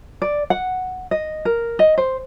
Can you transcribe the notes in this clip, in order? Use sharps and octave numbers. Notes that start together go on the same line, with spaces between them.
D5
F#5
D#5
A#4
D#5
C5